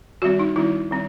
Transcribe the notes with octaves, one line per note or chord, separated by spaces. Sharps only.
D#3 G3 C4 F#4
D#4
D#3 G3 C4 E4
D#3 G3 C4